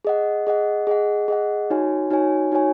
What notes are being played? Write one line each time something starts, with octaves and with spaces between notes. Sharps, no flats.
G#4 D#5 F#5
G#4 D#5 F#5
G#4 D#5 F#5
G#4 D#5 F#5
D#4 F#4 C#5 G#5
D#4 F#4 C#5 G#5
D#4 F#4 C#5 G#5